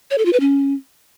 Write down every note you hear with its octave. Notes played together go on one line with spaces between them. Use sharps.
C#5
A4
F4
B4
C#4